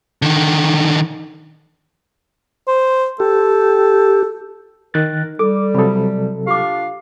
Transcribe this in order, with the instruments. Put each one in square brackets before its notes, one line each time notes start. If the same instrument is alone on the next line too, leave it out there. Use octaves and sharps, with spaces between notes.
[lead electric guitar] D3 D#3
[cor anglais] C5
[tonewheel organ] G4 [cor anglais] A4
[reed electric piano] D#3 F#6 A6 [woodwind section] A#4
[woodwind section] G3 [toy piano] A4 [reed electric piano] D6
[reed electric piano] C3 F#3 A4 [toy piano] B5 D#6
[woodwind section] D4 F4 F5 [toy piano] G4 D6